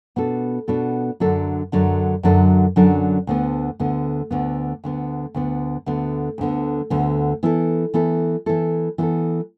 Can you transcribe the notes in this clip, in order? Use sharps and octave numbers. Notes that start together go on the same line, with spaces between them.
B2 B3 D4 F#4 A4
B2 B3 D4 F#4 A4
F#2 D3 F#3 D4 A4
F#2 D3 F#3 D4 A4
F#2 D3 F#3 D4 A4
F#2 D3 F#3 D4 A4
D2 D3 B3
D2 D3 B3
D2 D3 B3
D2 D3 B3
D2 D3 B3
D2 D3 B3
D2 D3 B3
D2 D3 B3
E3 B3 E4 A4
E3 B3 E4 A4
E3 B3 E4 A4
E3 B3 E4 A4